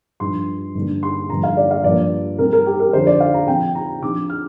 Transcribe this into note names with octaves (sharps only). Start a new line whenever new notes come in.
G2 F3 D4 C6
G2 D3 A#3 D4
C6
G2 D3 F3 A#3 A#5
F5
D5
F5
G2 F3 A#3 D5
C3 G3 C4 A#4
A#4
G4
A#4
F2 D3 F3 C5
D5
F5
A#5
C3 F3 C4 G5
A#5
C3 F3 D4 D6
F6